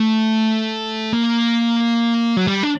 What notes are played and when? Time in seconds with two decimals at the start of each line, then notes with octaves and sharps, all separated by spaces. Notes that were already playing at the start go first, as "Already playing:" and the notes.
Already playing: A3
1.13 A#3
2.37 F#3
2.47 G3
2.63 D4